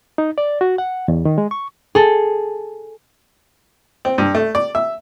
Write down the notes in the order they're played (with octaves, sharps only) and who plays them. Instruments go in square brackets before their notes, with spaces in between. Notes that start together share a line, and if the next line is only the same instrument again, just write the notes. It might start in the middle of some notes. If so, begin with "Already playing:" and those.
[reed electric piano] D#4
D5
F#4
F#5
E2
D#3
G#3
C#6
[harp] G#4 A4
[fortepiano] C4
G2
A3
D5
E5